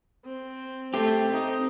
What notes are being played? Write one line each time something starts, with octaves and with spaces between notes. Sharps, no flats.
C4
A3 C4 G4
D#4